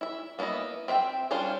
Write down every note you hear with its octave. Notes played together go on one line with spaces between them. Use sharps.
E4 E5
A#3 B3 D4 E4 D#5
C4 E5 F5 G5
G3 C#4 D4 F4 C5